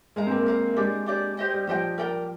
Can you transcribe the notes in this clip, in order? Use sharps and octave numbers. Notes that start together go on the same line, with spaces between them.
G#3 A#4 F5 A#5
C4
A#3
A#4 F5 A#5
G#3 D4 G4 D5
D4 G4 D5
G4 C5 D#5 G5
G3
F3 G4 C5 D#5 G5
A#4 D5 G5 A#5